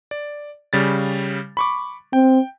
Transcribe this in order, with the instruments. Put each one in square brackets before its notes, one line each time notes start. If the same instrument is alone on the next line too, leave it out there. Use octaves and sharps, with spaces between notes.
[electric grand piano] D5
C#3 G3 A6
B5 C#6 D6
[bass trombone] C4 [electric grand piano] G5